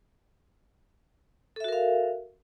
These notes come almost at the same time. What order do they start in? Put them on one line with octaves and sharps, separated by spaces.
A4 E5 F#4 A#4 F5